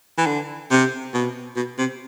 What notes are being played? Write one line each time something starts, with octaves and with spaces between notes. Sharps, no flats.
E3
D3
C3
B2
B2
C3